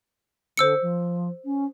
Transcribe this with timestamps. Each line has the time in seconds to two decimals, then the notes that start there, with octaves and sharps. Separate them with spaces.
0.57 D3 C5 E6 C#7
0.81 F3
1.44 C#4